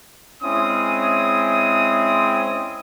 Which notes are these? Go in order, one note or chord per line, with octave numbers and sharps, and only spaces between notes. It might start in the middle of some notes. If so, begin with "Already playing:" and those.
G#3 C4 C#4 E4 D#6